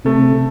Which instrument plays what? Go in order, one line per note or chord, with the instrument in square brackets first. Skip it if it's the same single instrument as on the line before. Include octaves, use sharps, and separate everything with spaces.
[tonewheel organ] C3 [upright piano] A3